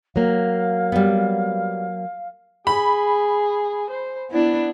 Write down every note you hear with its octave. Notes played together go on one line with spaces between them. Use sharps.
F#3 A#3 F5
G3 B3
G#4 B5
C5
B3 D4 E4